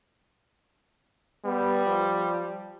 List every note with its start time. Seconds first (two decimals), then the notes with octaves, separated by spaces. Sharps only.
1.45 G3 B3
1.86 F3